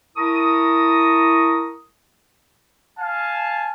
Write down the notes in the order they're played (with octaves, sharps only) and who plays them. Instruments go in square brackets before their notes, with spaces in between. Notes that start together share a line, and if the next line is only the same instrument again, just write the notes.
[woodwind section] E4 A#4 A5 A#5 C#6 D#6
[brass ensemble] F5 G#5 A5